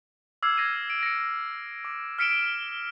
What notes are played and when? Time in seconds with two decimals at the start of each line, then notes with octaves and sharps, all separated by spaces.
0.43 D6 E6 F6 G#6 C7
0.58 G#6 A#6 C7 D#7
0.90 D7
1.03 A#6 C#7
1.85 D6
2.19 F6 B6 C#7 D7 E7 G7